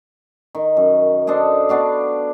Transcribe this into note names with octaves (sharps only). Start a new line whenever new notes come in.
D#3
F#2
D4 A4 C5 D#5
B3 D4 F#4 F5